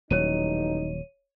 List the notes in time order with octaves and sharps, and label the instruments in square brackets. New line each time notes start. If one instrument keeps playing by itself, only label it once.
[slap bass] D#1 F#3 [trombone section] A1 D#4 [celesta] C#5 D#7